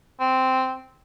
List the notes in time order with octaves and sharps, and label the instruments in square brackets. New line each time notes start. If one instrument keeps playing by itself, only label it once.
[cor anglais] C4